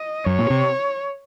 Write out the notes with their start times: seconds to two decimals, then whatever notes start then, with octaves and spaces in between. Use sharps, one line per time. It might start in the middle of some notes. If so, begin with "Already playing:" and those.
Already playing: D#5
0.26 F#2 C#5
0.39 A#2
0.50 C3